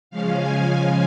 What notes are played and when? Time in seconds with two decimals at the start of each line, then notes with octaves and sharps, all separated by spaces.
0.10 C#3 F3 G#3 C#4 F5
0.40 G#5
0.70 G#5